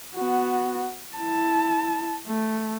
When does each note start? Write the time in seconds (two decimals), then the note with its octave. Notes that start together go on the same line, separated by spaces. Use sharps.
0.15 B3 F#4
1.17 E4 A5
2.27 A3